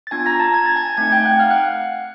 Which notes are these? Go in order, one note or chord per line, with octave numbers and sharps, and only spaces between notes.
A6
B3 D4 F4 G#5 G#6
A#5 A#6
A5 A6
G#6
A6
G#5 G#6
A3 C4 D#4 G#5 G#6
G5 G6
F#5 F#6
F5 F6
F#5 F#6